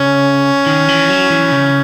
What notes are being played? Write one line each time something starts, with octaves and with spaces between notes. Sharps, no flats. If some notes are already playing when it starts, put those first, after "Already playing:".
Already playing: C#3 C#4
D#3
E3
F#3
E3
C#3